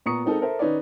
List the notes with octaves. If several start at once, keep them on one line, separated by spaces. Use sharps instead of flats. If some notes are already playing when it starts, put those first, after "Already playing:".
A#2 B3 A#5 C#6 D#6 C#7
G#3 C4 D#4 A4 A#4
A4 A#4 C5 E5
D#3 C#4 D#4 B4 C#5 D5